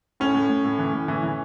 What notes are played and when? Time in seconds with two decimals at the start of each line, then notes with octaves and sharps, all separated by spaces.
0.20 A2 C#4
0.35 A2
0.50 A2
0.64 A2
0.79 E3
0.93 A2
1.08 E3
1.23 E3